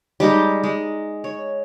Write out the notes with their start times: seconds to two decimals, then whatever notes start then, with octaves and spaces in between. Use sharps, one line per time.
0.20 G3 G#3 D#4 G4
0.63 G#3
1.24 C#5